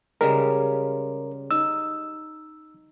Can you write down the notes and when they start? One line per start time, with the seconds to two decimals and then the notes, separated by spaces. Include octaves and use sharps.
0.21 C#3 G3 G#3 A#4
1.51 D#4 E6